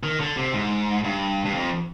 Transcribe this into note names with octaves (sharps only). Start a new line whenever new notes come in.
D#3
D3
C3
G#2
G2
G2
F2